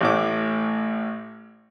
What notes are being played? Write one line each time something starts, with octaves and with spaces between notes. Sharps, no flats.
A1 A2 D6